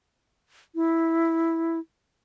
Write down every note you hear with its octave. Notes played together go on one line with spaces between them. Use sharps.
E4